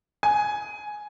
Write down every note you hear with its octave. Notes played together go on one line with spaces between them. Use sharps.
G#5